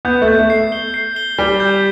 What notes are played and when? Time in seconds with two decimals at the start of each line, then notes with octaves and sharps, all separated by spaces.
0.05 B3 G6
0.22 A3
0.28 G6
0.39 A3
0.50 C7
0.72 G7
0.94 C7
1.16 G7
1.38 G3 G7
1.60 G6